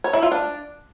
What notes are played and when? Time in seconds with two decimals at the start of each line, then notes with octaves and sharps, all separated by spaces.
0.04 C#5
0.13 E4
0.22 F4
0.32 D4